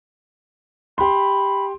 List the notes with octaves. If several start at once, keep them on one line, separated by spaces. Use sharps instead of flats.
G4 B5 C6